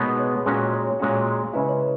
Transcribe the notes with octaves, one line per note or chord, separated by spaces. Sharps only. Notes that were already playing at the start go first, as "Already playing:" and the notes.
Already playing: B2 G#3 B3 D#4 G#4 A#4 B4 C#5
C#5
A#2 G#3 C#4 F#4 C#5
C#5
A#2 G#3 C#4 F#4
C#3 G#3 C#4 E4 B4 D#5
C#5
B4